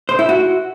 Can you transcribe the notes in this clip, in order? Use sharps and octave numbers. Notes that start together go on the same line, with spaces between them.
C5
E4
F#4